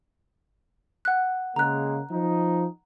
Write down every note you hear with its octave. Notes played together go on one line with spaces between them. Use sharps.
F#5 F#6
C#3 G#3 A#3 A#5 F#6
F3 D#4